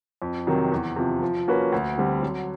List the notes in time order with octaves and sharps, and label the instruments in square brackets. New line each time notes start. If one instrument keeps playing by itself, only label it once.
[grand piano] F2
C3 D#3 F#3
E2
C3 F3
F3
A#3 C#4 F#4 B4
D2
D3 G3 C4
F#3